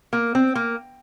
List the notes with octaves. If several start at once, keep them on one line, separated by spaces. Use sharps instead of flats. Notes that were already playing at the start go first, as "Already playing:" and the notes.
A#3
C4
A#3